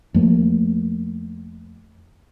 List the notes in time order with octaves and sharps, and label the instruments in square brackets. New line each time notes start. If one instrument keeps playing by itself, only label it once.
[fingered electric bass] F2 A3 A#3